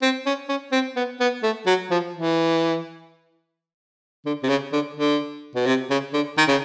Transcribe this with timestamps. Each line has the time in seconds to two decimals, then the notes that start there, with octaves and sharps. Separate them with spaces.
0.02 C4
0.26 C#4
0.49 C#4
0.72 C4
0.96 B3
1.20 B3
1.43 A3
1.67 F#3
1.91 F3
2.14 E3
4.26 D3
4.43 C3
4.49 C#3
4.73 D3
4.96 D3
5.56 B2
5.67 C3
5.90 C#3
6.14 D3
6.38 D#3
6.48 C#3